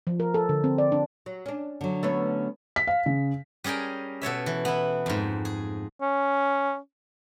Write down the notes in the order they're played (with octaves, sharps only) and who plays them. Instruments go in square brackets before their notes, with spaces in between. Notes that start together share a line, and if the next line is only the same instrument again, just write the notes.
[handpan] F3
A#4
A4
D3
C4
D5
D4
[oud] F#3
C#4 D4
[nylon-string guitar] D3 F#3
[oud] A3 B3 C#4
[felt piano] B6
F5
C#3
[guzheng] G3 C#4 G#4 A#4 G5
B2 A4 C#5 E5
E3
B3 E4
F2 G#2
G#4
[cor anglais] C#4